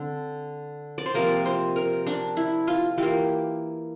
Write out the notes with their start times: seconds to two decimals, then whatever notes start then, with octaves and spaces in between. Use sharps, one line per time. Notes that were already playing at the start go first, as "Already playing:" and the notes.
Already playing: D3 C4
0.98 D5
1.06 C5
1.14 C3 F3 A#3 A#4
1.46 C5
1.76 A#4
2.06 D4
2.37 E4
2.67 F4
2.98 E3 A#3 G4